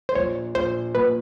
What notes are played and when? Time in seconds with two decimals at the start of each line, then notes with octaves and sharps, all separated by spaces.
0.09 C5
0.15 A#1 C#5
0.55 A#1 C5
0.95 A#2 B4